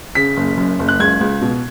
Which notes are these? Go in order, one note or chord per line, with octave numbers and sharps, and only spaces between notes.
C#3 B6
F#1
F#2
F#1
F#6
C#2 G#6
C#2
B2